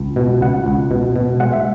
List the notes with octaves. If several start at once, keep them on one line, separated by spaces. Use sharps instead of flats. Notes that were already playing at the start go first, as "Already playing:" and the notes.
Already playing: C#2
B2
C#2 F#5
C#2
B2
B2
G#3 F#5
E5